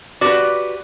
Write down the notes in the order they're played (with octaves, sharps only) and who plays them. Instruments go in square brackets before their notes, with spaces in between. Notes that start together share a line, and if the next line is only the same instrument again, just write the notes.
[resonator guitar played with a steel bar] F#4 G4 B4 [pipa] D5